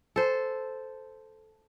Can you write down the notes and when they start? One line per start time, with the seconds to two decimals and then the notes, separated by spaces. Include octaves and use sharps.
0.16 A4 C5